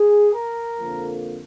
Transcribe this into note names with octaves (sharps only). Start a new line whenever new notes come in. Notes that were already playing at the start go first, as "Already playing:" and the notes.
Already playing: G#4
A#4
F2 D3 F3 A#3